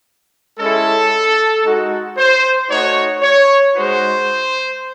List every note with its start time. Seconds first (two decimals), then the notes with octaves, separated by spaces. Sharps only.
0.58 G#3 C#4 E4 A4
1.65 G#3 D#4 F#4
2.18 C5
2.69 A3 D#4 F#4 C#5
3.22 C#5
3.75 G#3 D#4 F#4 C5